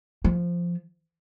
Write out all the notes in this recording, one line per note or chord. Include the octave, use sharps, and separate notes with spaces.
F3